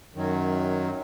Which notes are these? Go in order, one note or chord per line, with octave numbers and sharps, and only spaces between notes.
F#2 D#3 F#3